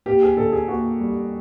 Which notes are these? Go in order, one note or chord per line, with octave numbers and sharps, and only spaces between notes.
A#3 G4
G#4
D3 A4
G#4
A#3 F#4
G3